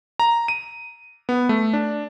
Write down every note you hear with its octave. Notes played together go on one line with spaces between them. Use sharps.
A#5
D#7
B3
A3
D4